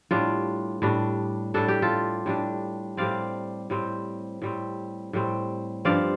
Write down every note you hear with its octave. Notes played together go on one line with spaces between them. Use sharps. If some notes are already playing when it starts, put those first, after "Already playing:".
A2 G3 D4 F4
A2 G3 D4
A2 G3 D4 A4
G4
F4 A4
A2 G3 D4
A2 G3 C4 D5 F5
A2 G3 C4
A2 G3 C4
A2 G3 C4
G2 F3 C4 D5 F5